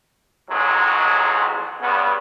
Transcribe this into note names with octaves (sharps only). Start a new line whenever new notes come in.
A1 F2 G#2 F#3 G#3
G2 C#3 B3